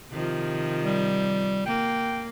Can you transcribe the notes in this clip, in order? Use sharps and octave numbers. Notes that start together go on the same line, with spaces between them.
C3 D#3 F3
G3
A#3 G5